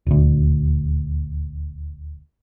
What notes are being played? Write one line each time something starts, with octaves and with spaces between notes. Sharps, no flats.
D#1 D2